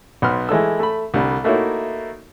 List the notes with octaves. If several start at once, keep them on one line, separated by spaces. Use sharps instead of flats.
B1 B3 C6 F6
E3 G#3 A3 E6
A3 B5
C2 D3 G3
A3 A#3 D#4 E4 F#4 C#5